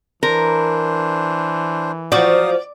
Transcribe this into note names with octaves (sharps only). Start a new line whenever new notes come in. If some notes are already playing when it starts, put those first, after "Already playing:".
E3 D4 A#4 C5
F3 F#3 F#4 D5 F5 D#6